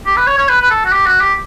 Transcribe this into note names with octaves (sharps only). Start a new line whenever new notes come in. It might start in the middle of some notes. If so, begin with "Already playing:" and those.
G4
B4
C#5
C#5
B4
B4
A4
F#4
G4
F#4
G4